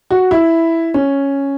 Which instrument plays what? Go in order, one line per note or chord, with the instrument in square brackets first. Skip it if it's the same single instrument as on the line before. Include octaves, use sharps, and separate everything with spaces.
[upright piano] F#4
E4
C#4